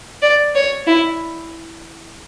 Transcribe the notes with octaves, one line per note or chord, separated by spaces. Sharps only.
D5
C#5
E4